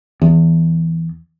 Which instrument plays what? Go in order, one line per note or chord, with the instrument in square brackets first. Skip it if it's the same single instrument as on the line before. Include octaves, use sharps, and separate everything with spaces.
[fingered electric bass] E2